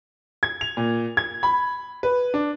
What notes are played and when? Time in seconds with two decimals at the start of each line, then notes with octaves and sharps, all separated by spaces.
0.43 G#6
0.61 F7
0.77 A#2
1.17 G#6
1.43 B5
2.03 B4
2.34 D4